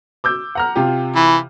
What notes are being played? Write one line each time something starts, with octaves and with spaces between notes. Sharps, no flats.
D6 E6 G6
F#5 A#5 F6
C3 F4 G4
E3 B5